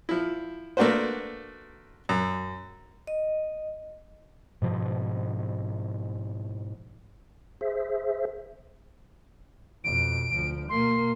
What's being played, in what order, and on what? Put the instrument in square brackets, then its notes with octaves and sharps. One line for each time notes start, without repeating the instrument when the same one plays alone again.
[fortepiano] F3 E4
A3 A#3 D4 F#4 B4 C5
F#2
[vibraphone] D#5
[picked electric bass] G#2 B2 F3
[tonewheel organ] G#4 C5 E5
[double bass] F2 B2 [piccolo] D7
[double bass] D2 F3
[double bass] B2 A#3 [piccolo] C6